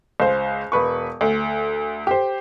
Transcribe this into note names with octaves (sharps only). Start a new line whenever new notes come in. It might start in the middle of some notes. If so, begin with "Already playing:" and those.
C#2 C5
E1 B4 C#6
D2
G4 C5